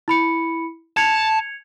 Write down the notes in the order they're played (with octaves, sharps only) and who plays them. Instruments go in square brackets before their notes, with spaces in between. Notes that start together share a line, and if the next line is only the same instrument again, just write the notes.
[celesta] E4 B5 C#7
[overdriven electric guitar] A5 [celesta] G#6 C#7 F7